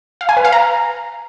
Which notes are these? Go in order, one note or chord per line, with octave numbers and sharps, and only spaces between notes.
F5
G#5
B4
F5
A#5